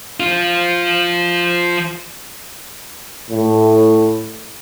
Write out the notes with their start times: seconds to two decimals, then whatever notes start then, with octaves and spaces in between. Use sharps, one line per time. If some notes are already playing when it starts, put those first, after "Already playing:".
0.20 F3 F4
3.31 A2